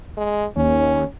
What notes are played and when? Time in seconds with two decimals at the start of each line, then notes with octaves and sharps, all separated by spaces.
0.17 G#3
0.56 D#2 C#4